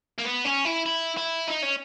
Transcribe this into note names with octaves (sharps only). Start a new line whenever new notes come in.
A#3
B3
C#4
E4
E4
E4
D#4
C#4